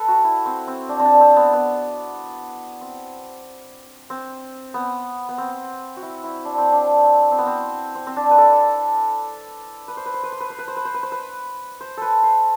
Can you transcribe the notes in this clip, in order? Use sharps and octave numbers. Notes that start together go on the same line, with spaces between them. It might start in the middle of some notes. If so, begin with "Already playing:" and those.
Already playing: A4 B4
F#4
E4
C4
C4
D4
C4
D4
C4
B3
B3
C4
C4
B3
B3
C4
F#4
E4
E4
D4
C4
D4
C4
B3
C4
C4
C4
D4
B4
A4
B4
C5
B4
C5
B4
C5
B4
C5
B4
C5
B4
C5
B4
C5
B4
C5
A4 B4
C5